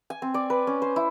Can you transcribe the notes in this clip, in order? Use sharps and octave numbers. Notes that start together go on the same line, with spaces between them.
G#5
C4
D5
B4
C#4
C5
E4